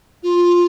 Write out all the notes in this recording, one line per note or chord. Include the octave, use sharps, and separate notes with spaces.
F4